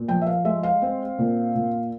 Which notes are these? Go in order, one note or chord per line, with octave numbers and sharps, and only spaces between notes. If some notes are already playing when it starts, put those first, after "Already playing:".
Already playing: A#2
F3 G5
E5
F5
G#3 E5
F5
C4
A#2
A#2